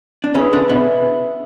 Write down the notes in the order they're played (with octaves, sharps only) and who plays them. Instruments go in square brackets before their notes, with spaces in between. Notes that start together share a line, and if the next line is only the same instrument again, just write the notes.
[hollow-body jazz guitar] D4
[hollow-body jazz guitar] C#3 C#4 [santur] E4 G#4 B4 E5
[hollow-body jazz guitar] D3 D4
B2 B3